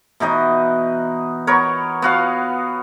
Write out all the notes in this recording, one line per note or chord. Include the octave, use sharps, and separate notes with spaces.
B2 E3 D#4 D#5
B3 A#4 C#5
B3 F#4 F5